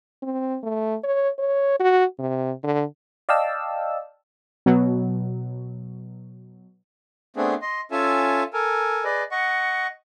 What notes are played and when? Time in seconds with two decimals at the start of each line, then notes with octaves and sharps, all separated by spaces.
0.22 C4
0.63 A3
1.03 C#5
1.38 C#5
1.80 F#4
2.19 C3
2.63 D3
3.29 D5 D#5 F5 G5 A5 E6
4.66 B2 F#3
7.37 A3 B3 C4 D4 G#4
7.62 D#5 C6
7.91 C#4 F4 A4 E5 G#5
8.53 A4 A#4 G#5
9.04 G#4 B4 D5 D#5
9.31 D#5 F#5 C#6